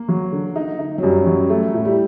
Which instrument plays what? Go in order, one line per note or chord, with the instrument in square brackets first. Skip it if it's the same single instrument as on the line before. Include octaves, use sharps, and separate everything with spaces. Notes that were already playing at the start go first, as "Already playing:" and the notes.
Already playing: [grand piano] A#3
[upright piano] F#3
D3
D#4
D#4
[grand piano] F#3
[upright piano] F#2 [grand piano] G3
[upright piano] F#3
A3
A2
[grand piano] G3